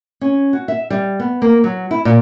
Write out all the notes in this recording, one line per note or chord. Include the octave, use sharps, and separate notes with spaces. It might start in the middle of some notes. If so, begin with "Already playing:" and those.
C#4
F#4
E5
G3
B3
A#3
F#3
E4
A#2